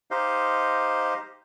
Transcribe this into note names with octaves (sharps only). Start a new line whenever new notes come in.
D#4 G4 C5 D#5 F5